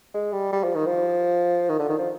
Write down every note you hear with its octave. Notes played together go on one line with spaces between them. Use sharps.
G#3
G3
G3
F3
D#3
F3
D#3
D3
D#3
F3